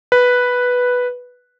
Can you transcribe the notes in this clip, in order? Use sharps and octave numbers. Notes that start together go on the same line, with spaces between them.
B4